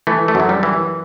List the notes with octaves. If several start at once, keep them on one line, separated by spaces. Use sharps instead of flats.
E3 A3
A3
F#2 F#3
G3
E3